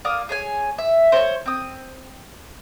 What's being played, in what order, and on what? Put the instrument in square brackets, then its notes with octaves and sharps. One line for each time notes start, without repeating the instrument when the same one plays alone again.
[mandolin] A#3 D5 F5 D#6
G#4 C#5 G#5
E5
C5 C#5
C4 D#6